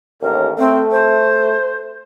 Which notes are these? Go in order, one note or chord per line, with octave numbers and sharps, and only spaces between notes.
A1 D#2 A#4
A3 C4
C5